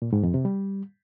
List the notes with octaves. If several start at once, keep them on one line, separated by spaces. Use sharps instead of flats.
A#2
G#2
F2
C3
G3